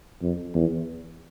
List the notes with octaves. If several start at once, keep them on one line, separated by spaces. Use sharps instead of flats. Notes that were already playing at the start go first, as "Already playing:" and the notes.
F2
E2